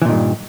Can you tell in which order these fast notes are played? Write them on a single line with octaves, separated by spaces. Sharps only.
E3 A#2 D#3 G2